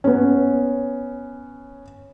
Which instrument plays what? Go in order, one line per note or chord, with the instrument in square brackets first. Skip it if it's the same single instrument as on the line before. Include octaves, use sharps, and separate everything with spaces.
[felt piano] B3 C#4